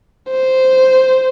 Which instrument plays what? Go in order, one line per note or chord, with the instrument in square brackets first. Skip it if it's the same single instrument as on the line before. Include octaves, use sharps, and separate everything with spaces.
[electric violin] C5